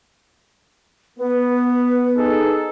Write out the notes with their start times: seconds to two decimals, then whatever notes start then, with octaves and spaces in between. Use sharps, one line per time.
1.19 B3 B4
2.16 D#4 G#4 A4